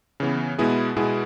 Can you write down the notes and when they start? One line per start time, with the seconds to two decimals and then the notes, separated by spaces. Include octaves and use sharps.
0.20 C#3 E3 B3
0.58 B2 G#3 B3 E4 G#4
0.96 B2 G#3 B3 E4 G#4